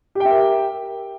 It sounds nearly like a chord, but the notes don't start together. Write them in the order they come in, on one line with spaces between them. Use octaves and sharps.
G4 G5 E5 A#4